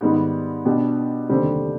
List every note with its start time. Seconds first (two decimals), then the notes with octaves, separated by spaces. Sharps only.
0.01 G#2 D#3 G3 B3 D#4
0.65 B2 B3 D4 G4
1.29 F1 D#2 D3 G3 C4